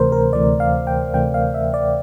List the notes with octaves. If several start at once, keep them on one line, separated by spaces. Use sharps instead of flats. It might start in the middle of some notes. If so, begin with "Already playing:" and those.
Already playing: D2 C3 E3 A3 A#4 C5
A#4
D2 C3 E3 A3 D5
F5
G5
D2 C3 E3 A3 G5
F5
E5
D5